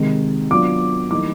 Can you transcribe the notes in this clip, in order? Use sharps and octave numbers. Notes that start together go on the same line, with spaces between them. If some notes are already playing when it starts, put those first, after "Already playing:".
Already playing: C3 D#3 G#3
F#3 B3 D4 F4 D6
E3 G3 A#3 D#4 D6